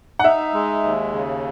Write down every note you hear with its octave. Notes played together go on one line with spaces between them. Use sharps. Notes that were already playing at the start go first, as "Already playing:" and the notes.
F#5
D#4 E5
G#3
D#2
C#3